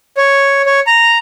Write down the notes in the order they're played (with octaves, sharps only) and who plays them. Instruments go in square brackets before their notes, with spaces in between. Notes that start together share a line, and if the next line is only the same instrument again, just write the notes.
[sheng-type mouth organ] C#5
C#5
A#5